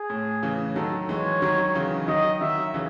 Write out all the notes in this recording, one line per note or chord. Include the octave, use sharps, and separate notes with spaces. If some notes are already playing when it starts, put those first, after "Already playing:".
Already playing: G#4
A2
C#3 E3
D#3 F#3 A4
E3 G#3 C#5
D#3 F#3
C#3 E3
D#3 F#3 D#5
D#3 F#3 E5
C#3 E3